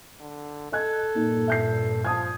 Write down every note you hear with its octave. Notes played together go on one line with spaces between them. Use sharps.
D3
A4 D#5 F#6 G#6
G2 A#2 A#3 D#4
E5 G6 C7
F3 A5 D#6 G#6